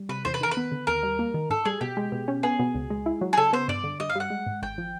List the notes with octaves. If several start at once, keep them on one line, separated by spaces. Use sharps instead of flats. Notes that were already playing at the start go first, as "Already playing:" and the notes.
Already playing: G3
C3 B4
E2 C5
B4
D#3 A#4
B4
B3
D3
D#2 A#4
G3
A#3
D#3
G#2 A4
G3 G#4
B2 G4
G#3
B2
C#4
B3 G#4
B2
C#2
G#3
E4
F#3
G#4
C#3 A4
B3 C5
G2 D5
D3
G2 D#5
F5
G3 F#5
G#3
G#2
G#1 G5
F3